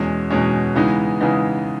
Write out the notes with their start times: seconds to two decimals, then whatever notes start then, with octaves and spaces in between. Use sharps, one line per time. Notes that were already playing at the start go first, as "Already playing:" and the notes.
Already playing: E2 B2 G#3 C#4
0.30 E2 B2 G#3 C#4
0.75 C#3 E3 G#3 B3 D#4
1.21 C#3 E3 G#3 B3 D#4